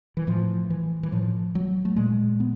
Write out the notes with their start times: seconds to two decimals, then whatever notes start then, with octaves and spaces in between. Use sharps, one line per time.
0.17 E3
0.27 A2 F3
0.70 E3
1.03 E3
1.12 A2 F3
1.55 F#3
1.85 A3
1.96 A#2 G#3
2.40 B3